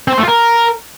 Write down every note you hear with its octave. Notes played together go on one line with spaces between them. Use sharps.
C4
C5
A3
F4
A#4